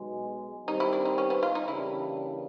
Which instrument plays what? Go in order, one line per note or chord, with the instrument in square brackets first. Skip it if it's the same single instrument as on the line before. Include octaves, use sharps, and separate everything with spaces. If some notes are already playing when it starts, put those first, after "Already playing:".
Already playing: [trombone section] B1 B2 G#3
[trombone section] D#3 G3 C4 [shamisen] D#4
[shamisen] E4
D4
D#4
C#4
B3
F4
D#4
[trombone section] C#3 E3 G3 A#3 D4 [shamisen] E4